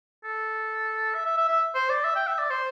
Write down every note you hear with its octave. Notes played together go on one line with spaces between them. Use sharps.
A4
E5
E5
E5
E5
C5
D5
E5
G5
E5
D5
C5